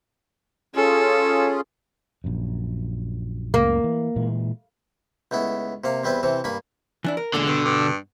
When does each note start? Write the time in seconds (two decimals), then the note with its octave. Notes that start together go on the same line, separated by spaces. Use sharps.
0.76 C#4 F4 G#4 A4
2.24 A#1 F#2
3.54 F#1 C#2 A#3
3.84 E3
4.16 A#2 E3 G#3
5.31 C#2 A3 B3 E4
5.84 C3 A#3 F5
6.04 E2 G3 C4 E4 B4
6.23 C3 E3 C4
6.44 G2 A#3 G#5 B5
7.04 E3 D4 E4
7.17 A#4
7.34 E2 A#2 D3 G#3
7.47 G2 B2
7.65 G2